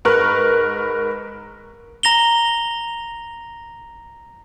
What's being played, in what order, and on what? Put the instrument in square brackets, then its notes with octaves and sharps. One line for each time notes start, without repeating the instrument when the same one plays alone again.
[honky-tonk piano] G#2 A#4 B4 C#6 F6 F#6
[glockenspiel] A#5 A#6 F7 G7